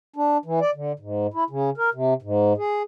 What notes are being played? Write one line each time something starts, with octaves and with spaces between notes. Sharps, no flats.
D4
E3
D5
D3
G#2
E4
C#3
A#4
C3
G#2
G#4